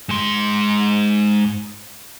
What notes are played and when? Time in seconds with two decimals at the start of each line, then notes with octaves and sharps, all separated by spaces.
0.09 G#2 C6